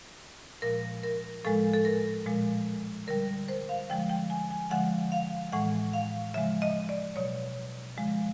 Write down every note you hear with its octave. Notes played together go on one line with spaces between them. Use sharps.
A#2 F3 G#3 A#4
A#4
A2 F3 G#3 A4
A4
A#4
A#2 F3 G#3
D3 G3 A#4
C5
F5
D3 F3 G#3 G5
G5
G#5
G#5
D3 F3 G#3 F#5
F5
A2 E3 G#3 F#5
F5
C#3 F3 G#3 E5
D#5
D5
B2 F#3 C#5
D3 F3 G#3